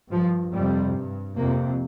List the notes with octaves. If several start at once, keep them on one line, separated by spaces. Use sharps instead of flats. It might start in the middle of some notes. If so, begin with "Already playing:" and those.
G2 F3
F2 C3 G3
G2
F2 C3 A#3